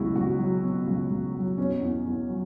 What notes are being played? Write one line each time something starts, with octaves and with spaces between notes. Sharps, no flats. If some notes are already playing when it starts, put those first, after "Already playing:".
Already playing: C#2 B2 F#3 E4 F#4 G#4
C#2 F#4
F#3
B2
C#2
C#2
F#3
B2 C#4
E2
E2
F#3